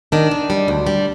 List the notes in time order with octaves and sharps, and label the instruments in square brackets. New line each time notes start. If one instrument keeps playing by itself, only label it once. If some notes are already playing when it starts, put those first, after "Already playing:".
[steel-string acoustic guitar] D#3 D4
D#3
G3
D2
G3